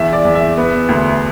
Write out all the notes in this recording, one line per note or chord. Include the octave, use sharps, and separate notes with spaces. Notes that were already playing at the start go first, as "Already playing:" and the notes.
Already playing: E2 E5
D5
E2
E5
B3
D2